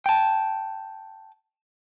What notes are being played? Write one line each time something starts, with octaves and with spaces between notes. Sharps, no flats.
G5 A5